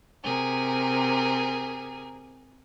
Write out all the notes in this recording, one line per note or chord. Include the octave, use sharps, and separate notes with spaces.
C3 G#4 A#4